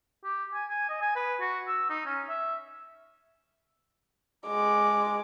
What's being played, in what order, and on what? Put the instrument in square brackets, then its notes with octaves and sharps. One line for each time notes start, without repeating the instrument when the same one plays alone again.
[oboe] G4
G#5
G#5
D#5
G#5
B4
F#4
E6
D#4
C#4
E5
[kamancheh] G#3 D6